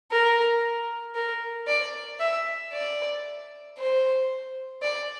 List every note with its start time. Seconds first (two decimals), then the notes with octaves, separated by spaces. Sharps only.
0.11 A#4
1.15 A#4
1.67 D5
2.20 E5
2.73 D5
3.78 C5
4.82 D5